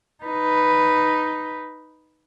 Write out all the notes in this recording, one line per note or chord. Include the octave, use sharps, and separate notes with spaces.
D#4 B4